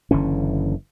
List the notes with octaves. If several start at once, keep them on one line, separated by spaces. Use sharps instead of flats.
F#1 D3 E3 C#4